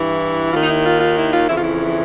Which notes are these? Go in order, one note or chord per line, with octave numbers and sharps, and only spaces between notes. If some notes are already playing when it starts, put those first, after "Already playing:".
Already playing: G2 E3 E4
D#2 D#3 F4
D#4
E4
F4
F4
E4
F4
F2 C#3 E3 E4
F4
E4